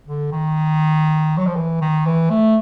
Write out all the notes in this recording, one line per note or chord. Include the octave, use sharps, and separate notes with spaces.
D3
D#3
F#3
F3
E3
D#3
E3
A3